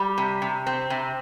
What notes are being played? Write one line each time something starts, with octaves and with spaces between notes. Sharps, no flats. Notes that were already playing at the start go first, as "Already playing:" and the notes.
Already playing: G3
C3
C3
C4
C3